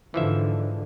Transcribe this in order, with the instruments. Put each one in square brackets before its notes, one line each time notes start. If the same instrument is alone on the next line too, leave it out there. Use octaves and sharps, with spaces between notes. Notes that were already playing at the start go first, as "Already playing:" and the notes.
[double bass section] G#2 D3 [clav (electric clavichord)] E3 F3 E5